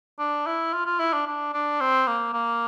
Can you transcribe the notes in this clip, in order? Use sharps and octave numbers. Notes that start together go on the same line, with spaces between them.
D4
E4
F4
F4
E4
D4
D4
D4
C4
A#3
A#3